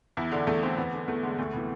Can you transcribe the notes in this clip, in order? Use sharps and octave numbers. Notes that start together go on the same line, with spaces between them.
E2 E4
D3 D4
E2 A3
D3 C4
E2 B3
D3
E2 A3
D3 G#3
D2 A3
C3 E3 B3